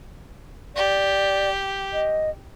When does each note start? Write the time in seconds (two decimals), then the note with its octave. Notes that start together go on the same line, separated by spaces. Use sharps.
0.76 G4 D5
1.93 D#5